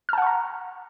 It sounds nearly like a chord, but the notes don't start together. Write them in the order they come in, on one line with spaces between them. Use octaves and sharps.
F6 A5 F#5 C#6 A#5